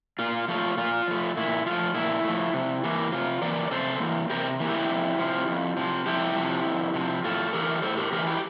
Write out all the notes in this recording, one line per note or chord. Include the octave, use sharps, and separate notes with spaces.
A#2 F4
F3 A3 F4
A#2 F4
F3 A3
A#2 E4
F3 A3 F4
A#2 E4
F3 A3
C3
E3 A#3
C3 F4
E3 A#3 A#4 D5
C3 A4 C5
E3 A#3
C3 G4 A#4
E3 A#3
E4 G4
F2
C3 F3
F2
C3 F3
F2 E4 G4
C3 F3
F2
C3 F3
A2 F4 A4
E3 A3 G4 A#4
A2 A4 C5
G4 A#4
E3 A3 G4 A#4
E4 G4